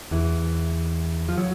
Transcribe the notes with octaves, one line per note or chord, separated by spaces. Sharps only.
E2 E3
F3
F#3